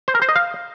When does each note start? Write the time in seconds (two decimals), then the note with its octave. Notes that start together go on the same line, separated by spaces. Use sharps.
0.08 C5
0.15 A#4
0.22 C5
0.29 D#5
0.36 F5